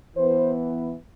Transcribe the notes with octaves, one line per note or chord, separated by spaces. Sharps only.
E3 B3 C5